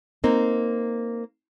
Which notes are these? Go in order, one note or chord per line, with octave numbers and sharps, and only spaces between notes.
A#3 C4 D#4